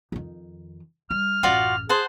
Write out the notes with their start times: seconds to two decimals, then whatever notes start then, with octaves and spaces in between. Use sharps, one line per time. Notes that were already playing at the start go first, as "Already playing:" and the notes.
0.12 F2 D#3
1.11 G3 F6
1.43 A1 F#2 F4 F#4 D5
1.89 G#4 C5 F#5 A5